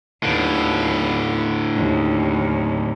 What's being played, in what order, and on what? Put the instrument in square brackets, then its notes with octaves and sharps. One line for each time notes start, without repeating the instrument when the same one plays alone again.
[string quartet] D#2 B3 F5 [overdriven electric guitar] A2 D3
[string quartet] D#2